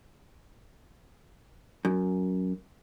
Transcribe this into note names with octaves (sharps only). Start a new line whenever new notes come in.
F#2